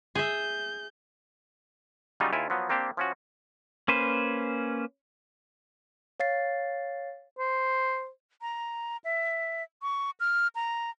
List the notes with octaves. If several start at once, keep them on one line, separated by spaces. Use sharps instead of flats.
G#4 E5 G6
C#3 F#3 G3 D#4 F4
D#2 E4 F4 G#5
F3 F#3 B3
A#3 C4 D4 G4
F3 C#4 F#4
A#3 C#4 B4 C5
C#5 F5 A6 C7
C5
A#5
E5
C#6
F6
A#5